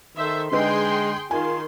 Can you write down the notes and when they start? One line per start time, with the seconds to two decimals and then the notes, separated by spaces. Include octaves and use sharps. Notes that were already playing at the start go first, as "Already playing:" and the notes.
0.17 D#3 A4 C5 E5
0.52 D3 G#3 D#4 G#4 B4 G5 C6
1.31 D#3 F4 G#5 C6